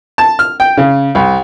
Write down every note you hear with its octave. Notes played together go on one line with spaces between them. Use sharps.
A5
F6
G5
C#3
C2